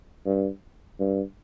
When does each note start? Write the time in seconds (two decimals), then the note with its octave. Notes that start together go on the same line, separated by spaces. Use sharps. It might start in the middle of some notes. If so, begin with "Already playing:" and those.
0.26 G2
1.00 G2